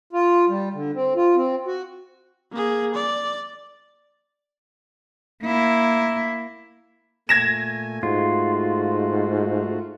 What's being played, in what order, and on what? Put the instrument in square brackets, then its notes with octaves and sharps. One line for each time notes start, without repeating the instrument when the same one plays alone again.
[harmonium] F4
G3
D3
C4
F4
C4
F#4
[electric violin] A#3 G#4
D5
[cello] A#3 E4
[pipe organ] A#2 A3 G#5 [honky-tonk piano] G#6 A#6 E7
[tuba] G#2 [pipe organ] A3 F#4 [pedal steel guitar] F4